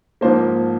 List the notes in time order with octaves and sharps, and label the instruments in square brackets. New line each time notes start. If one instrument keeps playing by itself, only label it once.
[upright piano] G#2 F3 A#3 C5